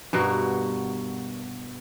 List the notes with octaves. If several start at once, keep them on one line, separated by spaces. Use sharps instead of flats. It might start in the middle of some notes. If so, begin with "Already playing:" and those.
G2 B2 F#4 A#4